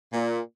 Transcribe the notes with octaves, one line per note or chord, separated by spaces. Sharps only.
A#2